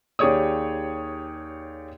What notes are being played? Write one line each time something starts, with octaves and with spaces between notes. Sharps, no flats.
D#2 G4 G#4 C#5 D5 D#6